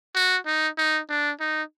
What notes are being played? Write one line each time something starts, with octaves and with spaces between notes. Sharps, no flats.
F#4
D#4
D#4
D4
D#4